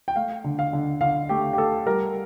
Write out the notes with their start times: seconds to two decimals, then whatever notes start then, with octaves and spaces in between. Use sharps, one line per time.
0.08 G5
0.16 A3 F5
0.44 D3
0.59 F5
0.73 D3
1.01 D3 F5
1.29 A3 G4
1.53 G4
1.58 A3 A4
1.87 G3 A#4